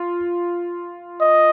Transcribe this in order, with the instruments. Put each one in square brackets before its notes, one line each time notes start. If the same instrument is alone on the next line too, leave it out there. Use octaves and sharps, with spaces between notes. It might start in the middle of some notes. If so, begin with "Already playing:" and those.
Already playing: [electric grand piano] F4
[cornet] D#5